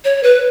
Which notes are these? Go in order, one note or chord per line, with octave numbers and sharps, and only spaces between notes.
C#5
B4